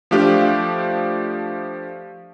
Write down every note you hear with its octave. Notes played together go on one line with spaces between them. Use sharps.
F3 A3 D4 G4 F5